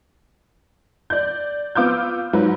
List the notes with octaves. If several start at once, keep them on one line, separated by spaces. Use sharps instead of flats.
D5 G6
B3 F4 D6 E6 F6 G6
G#2 F#3 B4